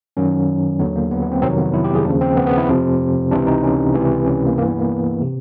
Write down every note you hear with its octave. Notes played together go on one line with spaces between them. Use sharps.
F#2 D#3 F#3 C#4
D#2 D3 F#3 B3
A#3
B3
B3
C4
F2 C3 D#3 F#3 C4
B3
E4
G4
G#4
D#2 C#3 F3 D4
C4
B3
B3
E4
F2 C3 F3
C#2 C3 E3 D4
D#4
C#4
C#2 C3 E3
C#4
A#3
G2 E3 A#3
B3
A#3
C3